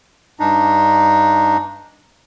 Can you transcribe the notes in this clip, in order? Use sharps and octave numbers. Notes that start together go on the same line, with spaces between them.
G2 D4 D#4